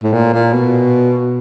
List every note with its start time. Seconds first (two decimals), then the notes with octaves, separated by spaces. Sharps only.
0.03 A2
0.13 A#2
0.34 A#2
0.53 B2